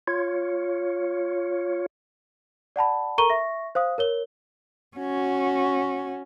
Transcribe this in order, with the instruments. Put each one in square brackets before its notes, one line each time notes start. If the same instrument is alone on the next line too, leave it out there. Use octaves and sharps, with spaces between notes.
[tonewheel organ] F4 C#5
[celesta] D5 F#5 A5 B5
A4 A#4 A#5 C#6 D#7 G7
E5 C#6 A#6
C5 F5 D#6
A#4 C#5 G7
[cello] C#4 F#4